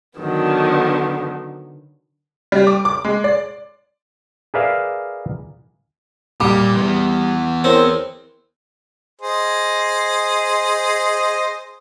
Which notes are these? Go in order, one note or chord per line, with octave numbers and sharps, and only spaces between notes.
D3 D#3 F#3 B3
G3
D6
D6
G#3
D5
G#4 A#4 B4 D5 E5 F5
A#2 G3 D6
E3 B3
C4 E4 A#4 C#5
G#4 C5 D#5